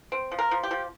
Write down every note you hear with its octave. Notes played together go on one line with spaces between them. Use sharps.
C4
F3
A#4
F3
G4
F3